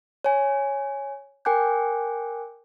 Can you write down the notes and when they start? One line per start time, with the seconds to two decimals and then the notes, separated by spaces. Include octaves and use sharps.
0.24 C#5 G#5
1.45 A#4 G5 G#5 D6 F#6 G6